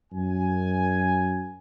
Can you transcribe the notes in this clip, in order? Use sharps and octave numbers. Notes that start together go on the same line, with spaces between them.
F#2 G#5